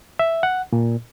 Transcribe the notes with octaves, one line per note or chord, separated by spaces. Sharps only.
E5
F#5
A#2